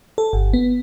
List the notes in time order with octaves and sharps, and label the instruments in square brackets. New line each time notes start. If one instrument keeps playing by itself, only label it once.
[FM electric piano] A4
G1
B3